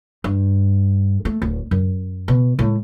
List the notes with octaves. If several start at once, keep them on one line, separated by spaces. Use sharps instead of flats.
G2
A3
D1
F#2
B2
A2 G#3